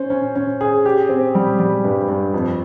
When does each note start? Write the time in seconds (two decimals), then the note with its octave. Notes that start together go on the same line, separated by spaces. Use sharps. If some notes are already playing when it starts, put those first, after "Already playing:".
Already playing: C#4 C5
0.10 C#4
0.35 C#4
0.61 G#4
0.86 G4
1.09 C4
1.35 G3
1.59 G3
1.84 G2
2.08 G2
2.34 F2